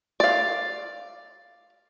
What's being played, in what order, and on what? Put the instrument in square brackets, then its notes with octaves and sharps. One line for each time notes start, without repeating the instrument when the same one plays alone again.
[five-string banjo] D5 F5